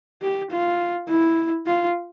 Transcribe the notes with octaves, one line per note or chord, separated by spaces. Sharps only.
G4
F4
E4
F4